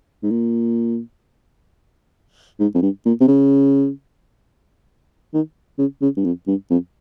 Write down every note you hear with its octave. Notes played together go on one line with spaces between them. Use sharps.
G#2
A#2
G#2
F2
G2
A#2
C3
C#3
D#3
C#3
C#3
G2
F2
G2
F2